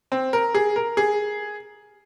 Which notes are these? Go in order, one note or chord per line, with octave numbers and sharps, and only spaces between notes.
C4
A#4
G#4
A#4
G#4